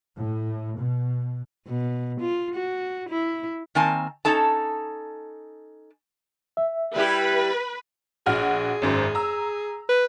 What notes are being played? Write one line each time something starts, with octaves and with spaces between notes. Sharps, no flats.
A2
B2
B2
F4
F#4
E4
D#3 A#3 C4 G#5 A5
C#4 D#4 A4 A5
E5
G3 E4 G4 B4
A#1 F#4 G#4 F6
G#1 F#2 C5
A#5 E6
B4